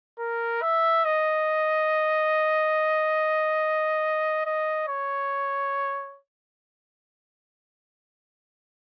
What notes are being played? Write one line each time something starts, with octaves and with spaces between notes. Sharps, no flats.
A#4
E5
D#5
D#5
C#5